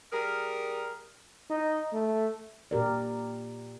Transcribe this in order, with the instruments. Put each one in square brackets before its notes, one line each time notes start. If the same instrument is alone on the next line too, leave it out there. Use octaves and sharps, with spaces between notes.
[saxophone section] G3 G#4 A#4
[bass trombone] D#4
A3
[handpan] A#2 G4 A#4 D5